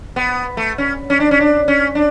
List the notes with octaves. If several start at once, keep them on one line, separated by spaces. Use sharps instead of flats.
B3
A3
C#4
C#4
D4
C#4
D4
C#4
D4